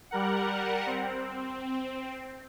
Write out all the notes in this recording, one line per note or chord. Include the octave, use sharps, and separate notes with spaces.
G3 A#4 F#5
C4